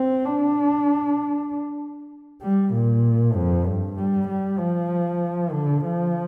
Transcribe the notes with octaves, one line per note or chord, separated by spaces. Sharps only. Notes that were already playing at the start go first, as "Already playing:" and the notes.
Already playing: C4
D4
G3
A#2
F2
G2
G3
G3
F3
D3
F3